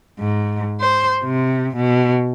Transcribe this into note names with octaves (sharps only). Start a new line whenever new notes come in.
G#2
C5
C3
B2